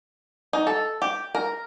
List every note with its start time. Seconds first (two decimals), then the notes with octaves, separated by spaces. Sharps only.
0.53 D#4
0.67 A4
1.02 G4
1.35 A#4